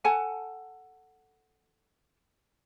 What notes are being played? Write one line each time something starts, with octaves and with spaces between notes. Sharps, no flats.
A4 F#5 G#5 A5